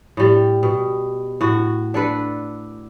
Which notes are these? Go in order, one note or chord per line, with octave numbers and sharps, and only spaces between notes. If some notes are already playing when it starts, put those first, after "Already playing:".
A2 G3
B2
A2 F#4
D4 A4 B4